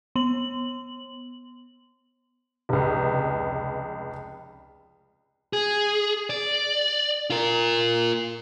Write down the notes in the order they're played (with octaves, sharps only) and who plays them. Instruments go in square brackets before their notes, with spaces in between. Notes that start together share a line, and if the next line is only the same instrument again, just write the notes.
[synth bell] B3 F#7
[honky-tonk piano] F1 C#2
[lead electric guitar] G#4
D5
F4 A#4